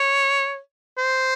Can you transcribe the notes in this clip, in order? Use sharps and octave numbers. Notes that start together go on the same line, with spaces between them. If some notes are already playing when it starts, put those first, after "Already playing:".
Already playing: C#5
C5